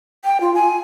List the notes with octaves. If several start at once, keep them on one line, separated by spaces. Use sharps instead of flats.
G5
F4
G#5